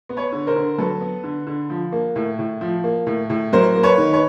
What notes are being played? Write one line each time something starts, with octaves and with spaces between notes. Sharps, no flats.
B3
B4 C#5
D3
A#4 C5
D3
F#3 A4 B4
B3
D3
D3
F3
A#3
A2
A2
F3
A#3
A2
A2
F#3 A#4 C5
A#3
B4 C#5
D#3
B4 C#5